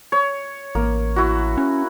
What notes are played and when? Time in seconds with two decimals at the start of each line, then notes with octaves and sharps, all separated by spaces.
0.12 C#5
0.75 A1 A#3
1.16 E4 F#4
1.57 C#4